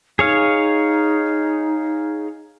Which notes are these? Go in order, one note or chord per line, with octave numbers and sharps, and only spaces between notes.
D#4 G#4 C#5 F5